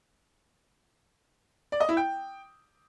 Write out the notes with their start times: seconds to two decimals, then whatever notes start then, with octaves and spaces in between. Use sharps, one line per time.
1.72 D5
1.80 D#5
1.89 E4
1.97 G5